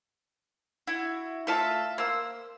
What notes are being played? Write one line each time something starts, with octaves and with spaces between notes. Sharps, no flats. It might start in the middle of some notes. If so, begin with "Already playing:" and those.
E4 F#4
A3 F4 A4 E5 F5
A#3 C5 E6